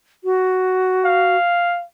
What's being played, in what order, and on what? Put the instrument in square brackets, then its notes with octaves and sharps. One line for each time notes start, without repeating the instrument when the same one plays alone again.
[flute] F#4
[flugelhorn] F5